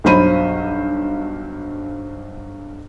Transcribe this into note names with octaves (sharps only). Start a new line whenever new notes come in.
B1 G2 F#3 C5 B5 D#7